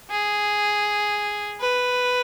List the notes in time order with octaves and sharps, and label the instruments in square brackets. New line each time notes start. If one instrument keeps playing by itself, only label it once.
[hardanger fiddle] G#4
B4